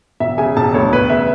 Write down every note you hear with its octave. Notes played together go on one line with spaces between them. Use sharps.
E1 E5
C#3 G#5
E1 A5
D2 C#5
E1 B4
C#3 E5